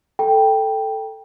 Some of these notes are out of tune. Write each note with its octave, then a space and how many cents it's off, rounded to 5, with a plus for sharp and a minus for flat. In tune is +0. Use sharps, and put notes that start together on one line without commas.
A4 +0 G5 +0 A#5 +35